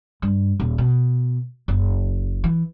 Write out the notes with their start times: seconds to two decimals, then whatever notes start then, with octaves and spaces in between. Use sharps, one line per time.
0.22 G2
0.60 D#1
0.78 B2
1.68 F#1
2.44 E3